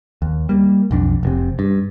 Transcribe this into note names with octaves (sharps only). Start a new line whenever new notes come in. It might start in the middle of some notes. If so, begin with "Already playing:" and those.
D#2
G3 A#3
B1 F2 D4
F1 A2 C3
G2